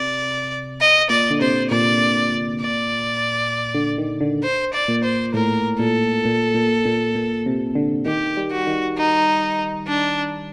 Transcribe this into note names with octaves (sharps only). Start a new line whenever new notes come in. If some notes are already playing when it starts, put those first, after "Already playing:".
Already playing: C3 D5
D#5
A#2 D5
D3
C3 C5
A#2 D5
D5
D3
D#3
D3
C5
D5
A#2
C5
A2 A#4
A#2 A4
A#2
A#2
A#2
A#2
C3
D3
D#3 G4
G3
F#4
D#3
D#4
D4